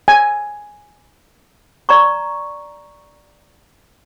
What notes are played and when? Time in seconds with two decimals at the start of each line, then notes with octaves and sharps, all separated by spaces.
0.08 G#5
1.89 D5 A#5 C#6